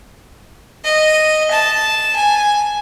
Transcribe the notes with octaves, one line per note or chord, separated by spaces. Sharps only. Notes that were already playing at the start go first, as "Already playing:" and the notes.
D#5
A5
G#5